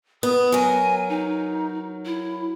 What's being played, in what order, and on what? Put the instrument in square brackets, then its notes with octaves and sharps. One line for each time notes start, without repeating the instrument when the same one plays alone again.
[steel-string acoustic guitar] B3 [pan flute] D#6
[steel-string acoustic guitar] F#3 A#4 [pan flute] G#5
[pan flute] D#4
E4